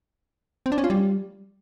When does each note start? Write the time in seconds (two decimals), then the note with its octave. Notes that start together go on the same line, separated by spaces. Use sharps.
0.66 C4
0.72 D4
0.78 C#4
0.84 F4
0.90 G3